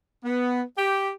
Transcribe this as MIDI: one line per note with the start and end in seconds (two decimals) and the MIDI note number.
0.23 0.61 59
0.77 1.09 67